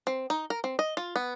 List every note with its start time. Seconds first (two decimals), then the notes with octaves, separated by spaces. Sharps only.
0.07 C4
0.30 D#4
0.50 A#4
0.64 C4
0.79 D#5
0.97 F4
1.16 B3